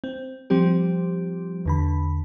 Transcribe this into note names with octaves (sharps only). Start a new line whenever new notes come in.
C4
F3 G3 C4 G4
E2 D3 B5